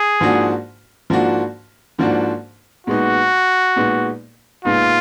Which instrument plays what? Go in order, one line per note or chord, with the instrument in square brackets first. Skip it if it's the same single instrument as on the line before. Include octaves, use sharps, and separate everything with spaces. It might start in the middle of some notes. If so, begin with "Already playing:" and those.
Already playing: [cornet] G#4
[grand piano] G#2 F3 A#3 D4 F#4
G#2 F3 A#3 D4 F#4
G#2 F3 A#3 D4 F#4
[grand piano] A#2 G#3 B3 D#4 [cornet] F#4
[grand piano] A#2 G#3 B3 D#4
[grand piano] A#2 G#3 B3 D#4 [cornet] F4